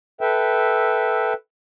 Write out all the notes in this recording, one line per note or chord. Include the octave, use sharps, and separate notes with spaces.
A4 B4 E5 G5